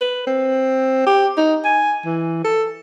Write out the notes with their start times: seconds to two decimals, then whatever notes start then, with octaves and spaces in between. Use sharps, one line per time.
0.01 B4
0.27 C4
1.06 G4
1.37 D#4
1.65 G#5
2.05 E3
2.44 A4